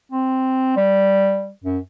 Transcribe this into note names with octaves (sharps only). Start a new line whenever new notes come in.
C4
G3
F#2